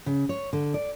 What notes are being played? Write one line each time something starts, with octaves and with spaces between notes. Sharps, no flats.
C#3
C#5
D3
D5